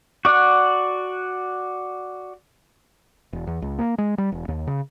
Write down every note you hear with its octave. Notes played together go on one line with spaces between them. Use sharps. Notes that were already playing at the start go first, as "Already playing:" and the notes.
F#4 D5 F#5
E1
E2
C#2
A#3
G#3
G3
E1
D#2
C#3